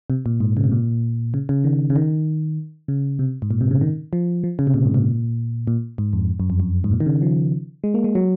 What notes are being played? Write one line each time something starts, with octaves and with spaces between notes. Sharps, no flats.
C3
A#2
G#2
C#3
C3
A#2
C#3
C#3
D#3
C#3
D#3
C#3
C3
G#2
A#2
C3
C#3
D#3
F3
F3
C#3
C3
A#2
G#2
A#2
A#2
G#2
F2
F#2
F2
F#2
G#2
A#2
D#3
C#3
F3
G#3
A#3
G#3
F#3